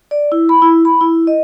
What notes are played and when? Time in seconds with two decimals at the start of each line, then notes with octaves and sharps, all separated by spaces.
0.11 D5
0.32 E4
0.49 B5
0.62 E4
0.85 B5
1.01 E4
1.27 D#5